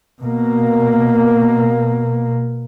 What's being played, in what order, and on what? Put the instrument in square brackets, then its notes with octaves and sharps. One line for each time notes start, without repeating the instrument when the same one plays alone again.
[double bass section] B2 A#3